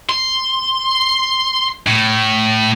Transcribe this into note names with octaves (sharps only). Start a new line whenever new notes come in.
C6
A2